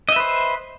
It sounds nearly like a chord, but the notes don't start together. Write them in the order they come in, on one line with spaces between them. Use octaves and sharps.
D#5 E5 B4 C5